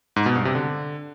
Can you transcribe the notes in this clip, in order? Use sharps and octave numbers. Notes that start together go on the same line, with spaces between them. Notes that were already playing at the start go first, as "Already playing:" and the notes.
G#2
B2
G2
C3
D3